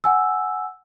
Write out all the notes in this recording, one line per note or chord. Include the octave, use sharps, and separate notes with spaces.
F#5 G#5 E6